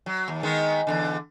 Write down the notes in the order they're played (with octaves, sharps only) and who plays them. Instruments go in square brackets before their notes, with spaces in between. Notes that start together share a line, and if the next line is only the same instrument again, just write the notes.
[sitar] F#3
D#2
D#3 G#3 B3
E2 A#2 D3